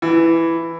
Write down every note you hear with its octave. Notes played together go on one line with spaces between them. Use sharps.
E3